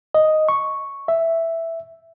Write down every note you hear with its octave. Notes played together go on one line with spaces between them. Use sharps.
D#5
C#6
E5